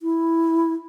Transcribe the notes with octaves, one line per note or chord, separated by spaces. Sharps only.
E4